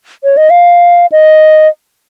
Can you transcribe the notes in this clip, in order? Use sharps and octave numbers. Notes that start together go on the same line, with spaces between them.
C#5
D#5
F5
D#5